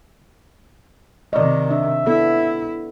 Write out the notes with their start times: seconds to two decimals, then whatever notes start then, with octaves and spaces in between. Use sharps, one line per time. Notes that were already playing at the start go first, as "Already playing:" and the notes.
1.33 C3 D#3 D5 D#5
1.71 D4 E5
2.07 B3 E4 A4